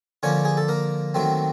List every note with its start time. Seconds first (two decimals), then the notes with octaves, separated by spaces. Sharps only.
0.23 D3 F3 A#3 C#4 C#5
0.45 G#4
0.57 A4
0.68 A#3 A#4
1.14 D#3 F#3 A3 C4